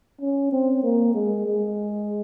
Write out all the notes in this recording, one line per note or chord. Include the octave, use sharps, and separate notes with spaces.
C#4
C4
A#3
G#3
G#3